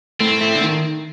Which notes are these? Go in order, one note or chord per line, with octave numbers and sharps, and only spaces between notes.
A2 A3 C4
A2 A3
D3
D#3